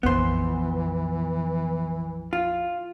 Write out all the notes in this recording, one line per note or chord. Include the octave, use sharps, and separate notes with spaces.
A#1 F2 E3 B3 C5
F4